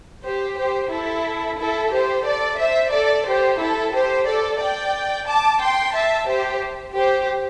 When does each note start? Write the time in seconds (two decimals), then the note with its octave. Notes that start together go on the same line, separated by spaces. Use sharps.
0.24 G4 C5
0.58 G4 C5
0.91 E4 A4
1.58 E4 A4
1.92 G4 C5
2.25 A4 D5
2.59 C5 E5
2.92 A4 D5
3.26 G4 C5
3.60 E4 A4
3.93 G4 C5
4.27 A4 D5
4.61 D5 G5
5.27 A5 D6
5.61 G5 C6
5.94 E5 A5
6.28 G4 C5
6.95 G4 C5